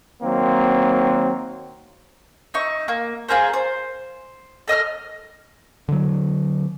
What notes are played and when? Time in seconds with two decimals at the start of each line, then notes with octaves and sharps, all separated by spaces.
0.22 D#3 F#3 A#3 C4
2.54 D#4 E5 C#6
2.88 A#3
3.29 F4 G#4 A#4 C5
3.53 C5
4.68 A4 D#5 E6 F6
5.88 D3 F#3